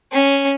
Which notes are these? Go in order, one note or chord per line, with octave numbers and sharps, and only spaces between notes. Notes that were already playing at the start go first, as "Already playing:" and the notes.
C#4